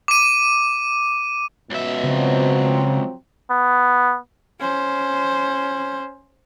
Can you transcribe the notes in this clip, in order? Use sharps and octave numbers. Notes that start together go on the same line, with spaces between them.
D6 D#7
C#2 B2 E5
C#3 F3 F#3 C4
B3
C#4 C5